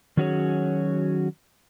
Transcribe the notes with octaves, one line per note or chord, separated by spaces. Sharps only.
D#3 F#3 C#4 F#4 G#4 C#5